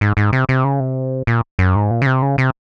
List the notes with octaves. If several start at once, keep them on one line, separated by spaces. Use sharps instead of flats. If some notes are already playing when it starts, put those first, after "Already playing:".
G#2
G#2
C3
C3
C#3
C3
A#2
F#2
G#2
A#2
C#3
C3
C#3
C3